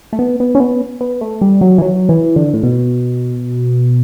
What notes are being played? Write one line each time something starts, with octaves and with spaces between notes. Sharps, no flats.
A3
B3
B3
C#4
B3
B3
A3
G3
F#3
E3
F#3
E3
D3
A2
B2